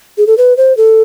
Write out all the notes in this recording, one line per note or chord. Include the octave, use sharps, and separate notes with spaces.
G#4
A4
B4
C5
A4